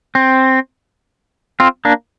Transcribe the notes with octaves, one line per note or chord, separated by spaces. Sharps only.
C4
C4 F4
A#3 D4